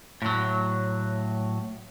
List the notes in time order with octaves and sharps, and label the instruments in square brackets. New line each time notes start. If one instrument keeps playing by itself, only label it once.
[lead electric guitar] A2 F#3